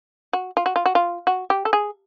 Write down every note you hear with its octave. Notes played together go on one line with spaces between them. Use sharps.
F#4
F4
F#4
F4
F#4
F4
F#4
G4
A4
G#4